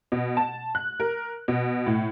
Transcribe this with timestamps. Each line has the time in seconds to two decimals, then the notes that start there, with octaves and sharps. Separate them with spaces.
0.12 B2
0.37 A5
0.75 F#6
1.00 A#4
1.48 B2
1.86 A2